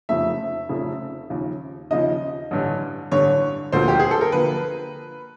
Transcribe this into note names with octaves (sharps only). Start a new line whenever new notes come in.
F1 F2 C#3 F3 A3 E5
F1 F2 C#3 F3 A3
D#2 C#3 F3
D#2 C#3 F3 D#5
A1 G2 D3
A1 G2 D3 C#5
E1 D2 D3 F3 A#3 C5
G4
G#4
A4
A#4
D3 F3 A#3 B4